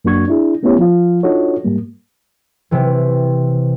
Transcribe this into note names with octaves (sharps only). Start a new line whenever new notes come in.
F#2 A#3 D4 F#4 C#6 G#6
D4 E4 G#4
A3 B3 C#4 E4 G4 C#5
F3 F4 F5
D4 D#4 F4 F#4 A4 C#5
G#2 G3 A#3
C3 E3